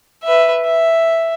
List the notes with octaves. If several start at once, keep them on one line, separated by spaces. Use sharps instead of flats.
B4 E5
E5